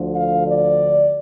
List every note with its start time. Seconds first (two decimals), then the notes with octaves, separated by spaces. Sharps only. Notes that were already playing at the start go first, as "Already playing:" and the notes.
Already playing: D2 D3 F3
0.15 F5
0.46 D5